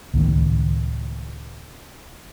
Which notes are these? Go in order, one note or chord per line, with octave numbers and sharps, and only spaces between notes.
C#2 A2 D#3